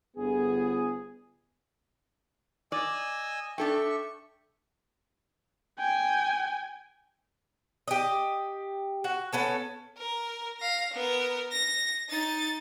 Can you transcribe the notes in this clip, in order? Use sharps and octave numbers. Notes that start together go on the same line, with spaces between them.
G1 B3 G#4
D5 D#5 G#5 E6
D4 A4 E5 G5 C#6
G5 G#5
G4 D#5
F#4
B3 C#4 A4
A#4
F5 A#6
B3 A#4
A#6
D#4 A6